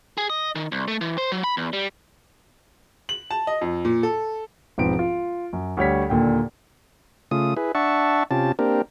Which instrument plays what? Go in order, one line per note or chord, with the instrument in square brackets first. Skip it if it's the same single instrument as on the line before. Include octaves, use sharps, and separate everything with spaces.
[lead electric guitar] G#4
D#5
D#3
C2
A3
E3
C5
F#3
B5
E2
G3
[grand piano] F#7
A5
D#5
F2
A#2
A4
E1 G#2 F3 C4 B4 D7
F4
F#2
D2 G3 C#5 B6
D#2 A#2 D3 G5
[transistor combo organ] C#3 A3 F4 D#6
E4 G#4 B4
D4 E5 F#5 A5 C#6
C3 C#4 F4 G4 A5
A#3 C4 D4 G4 A#4